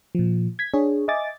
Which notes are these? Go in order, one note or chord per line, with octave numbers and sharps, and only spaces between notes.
A#2 F3
G#6 B6
D4 G#4 C#5
D#5 E5 G#5 D6 A6